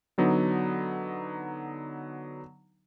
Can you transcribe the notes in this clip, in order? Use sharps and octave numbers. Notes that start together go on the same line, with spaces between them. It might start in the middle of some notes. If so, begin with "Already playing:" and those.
D3 F#3 B3 D#4